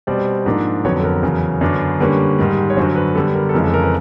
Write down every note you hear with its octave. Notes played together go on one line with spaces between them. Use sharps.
B2 G3 C4 D5
G#2 F3 A#3 D4
F2 D3 F#3 B3 C#5
A4
A#4
E2 C#3 F#3
F#2 D3 F#3 B3 D4
D3 G3 A#3 C#4 B4
G#2 D#3 G3
C#5
F#2 D3 F#3 C5
B4
D3 G3 B3 D4 A4
A#4
A4
F2 C#3 E3 G#3 A#4
A4
A#4
B4